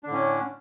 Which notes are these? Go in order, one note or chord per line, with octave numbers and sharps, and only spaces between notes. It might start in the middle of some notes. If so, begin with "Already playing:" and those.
A2 D3 C#4 D4